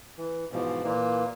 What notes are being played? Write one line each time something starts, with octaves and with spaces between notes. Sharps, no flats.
E3
G#2 B2 E3 F3
A#2 E3 A#3